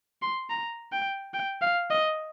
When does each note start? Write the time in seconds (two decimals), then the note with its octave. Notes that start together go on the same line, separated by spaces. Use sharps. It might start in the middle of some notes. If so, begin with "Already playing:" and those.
0.22 C6
0.49 A#5
0.92 G5
1.34 G5
1.61 F5
1.91 D#5